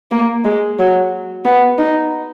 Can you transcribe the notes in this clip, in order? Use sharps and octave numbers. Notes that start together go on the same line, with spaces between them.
A#3
G#3
F#3
B3
D#4